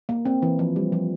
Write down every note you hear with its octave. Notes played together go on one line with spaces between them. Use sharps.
A#3
C4
E3
F3
G3
F3